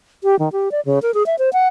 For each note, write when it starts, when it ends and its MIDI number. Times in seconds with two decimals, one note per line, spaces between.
0.24 0.38 67
0.39 0.49 51
0.52 0.71 67
0.72 0.81 74
0.85 0.99 49
1.02 1.14 70
1.14 1.26 68
1.26 1.36 76
1.39 1.50 72
1.53 1.68 78